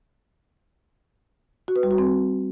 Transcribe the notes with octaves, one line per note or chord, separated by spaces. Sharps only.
F#4
B4
G3
F#4
C4